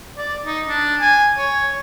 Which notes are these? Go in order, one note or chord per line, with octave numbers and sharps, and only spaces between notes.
D5
D#4
D4
G#5
C#5